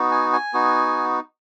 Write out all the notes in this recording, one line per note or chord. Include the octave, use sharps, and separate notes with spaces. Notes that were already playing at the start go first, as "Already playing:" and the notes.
Already playing: B3 D#4 F#4
G#5
G#5
B3 D#4 F#4